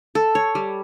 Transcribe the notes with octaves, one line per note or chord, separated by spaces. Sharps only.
A4
C#5
G3